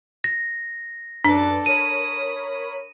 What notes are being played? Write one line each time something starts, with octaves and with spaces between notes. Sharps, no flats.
A#6
F#2 D4 A4 B4 D5
A#4 C#5 B5 D#6 D#7